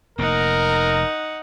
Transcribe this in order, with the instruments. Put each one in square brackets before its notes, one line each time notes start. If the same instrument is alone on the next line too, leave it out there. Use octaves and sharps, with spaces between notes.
[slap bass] F1 A#3 [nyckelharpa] D#4 F#5 [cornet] A#4